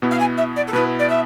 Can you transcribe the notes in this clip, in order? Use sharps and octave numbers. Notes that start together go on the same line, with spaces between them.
B2 B3 E4
F5
G#5
E5
D5
A4
B2 B3 E4 B4
D5
E5